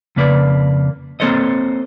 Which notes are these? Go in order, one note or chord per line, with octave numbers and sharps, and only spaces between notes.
F2 C#3 A#3 B4 D5
A#3 C4 A4 C5 C#5 D#5